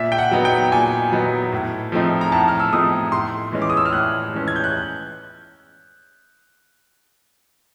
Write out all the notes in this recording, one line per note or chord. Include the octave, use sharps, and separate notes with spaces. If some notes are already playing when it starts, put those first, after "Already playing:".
Already playing: A#2 E5
G5
F#5
F#3 B3 D#4
G5
A#2 G#5
F#3 B3 D#4
A2
F3 A3 C4 D#4
A#5
A2 A5
F6
E6
F3 A3 C4 D#4 D#6
A2 C6
E3 G#3 C#4
D6
D#6
E6
F6
A2 F#6
E3 G#3 C#4
G#6
G6
F#6